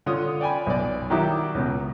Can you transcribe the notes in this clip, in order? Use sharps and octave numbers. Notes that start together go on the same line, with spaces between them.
D3 F4 C#5 D#6
D5 G5 G#5 B5
B1 D5
D#3 F#3 D#4 E4 G4
C#2 B2